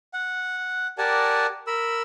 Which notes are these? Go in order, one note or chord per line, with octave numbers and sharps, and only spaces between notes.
F#5
G4 A#4 D5 F#5 G#5 A5
A#4 B5 E6